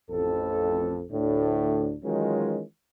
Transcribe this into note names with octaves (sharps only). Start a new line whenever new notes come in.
A1 F2 A4
D2 A2 D4
D#3 E3 F#3 G#3 C#4 F4